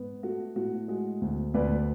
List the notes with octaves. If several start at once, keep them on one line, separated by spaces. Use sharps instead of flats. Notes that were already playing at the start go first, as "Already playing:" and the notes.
Already playing: G#2 B3
A3 F#4
A2 F#4
G#3 F#4
D2
D2 B4 D5